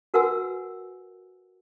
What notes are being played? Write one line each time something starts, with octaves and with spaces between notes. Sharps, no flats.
F#4 A#4 B4 F#5 G#5 E6